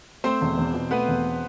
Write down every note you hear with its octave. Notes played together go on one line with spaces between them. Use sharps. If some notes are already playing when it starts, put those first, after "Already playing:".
A3 C4 C5
E1
E2
B2
A3 B3 B4
E1